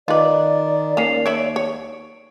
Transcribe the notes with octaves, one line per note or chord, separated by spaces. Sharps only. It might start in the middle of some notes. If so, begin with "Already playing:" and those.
D#3 F4 B4 D5 D#5 D6
D#2 A#3 C#4 A#4 C7 F7
C#5 E5 B5 D7
C#5